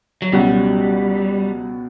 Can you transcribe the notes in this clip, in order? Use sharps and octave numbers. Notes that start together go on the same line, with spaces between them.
F#3
C#2 B2 F#3 G3 C#4 F#4